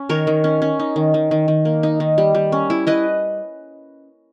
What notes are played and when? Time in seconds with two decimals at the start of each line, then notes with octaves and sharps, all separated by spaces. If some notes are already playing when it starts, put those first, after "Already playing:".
Already playing: C#4
0.09 D#3 A#4 C#5
0.27 D#3
0.44 C#4
0.62 C#4
0.80 D#4
0.96 D#3
1.14 D#3
1.31 D#3
1.48 D#3
1.65 A#3
1.83 D#4
2.00 D#3
2.18 G3
2.35 G3
2.52 C#4
2.70 E4
2.87 E4 B4 D#5